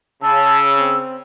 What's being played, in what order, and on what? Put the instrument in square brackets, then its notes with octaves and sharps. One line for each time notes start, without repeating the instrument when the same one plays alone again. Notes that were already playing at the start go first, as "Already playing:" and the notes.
[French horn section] C#3 [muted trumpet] A5 [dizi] E6
[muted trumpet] C4